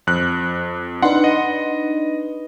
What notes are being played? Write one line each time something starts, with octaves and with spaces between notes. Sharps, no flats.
F2 F#6
D4 D#4 B4 F#5 C6
D#5